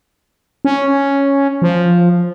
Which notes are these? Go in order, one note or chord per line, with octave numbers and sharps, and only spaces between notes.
C#4
F3